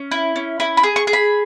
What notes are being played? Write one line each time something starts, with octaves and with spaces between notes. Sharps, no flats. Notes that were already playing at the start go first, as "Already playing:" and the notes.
Already playing: C#4
E4
C#4
E4 B5
B5
G#4
C#6
G#4
B5